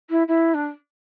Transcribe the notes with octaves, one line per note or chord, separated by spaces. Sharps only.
E4
E4
D4